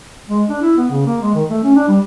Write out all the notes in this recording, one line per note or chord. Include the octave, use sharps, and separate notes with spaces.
G#3
D4
E4
B3
C#3
A#3
G#3
D#3
A3
C#4
D4
G3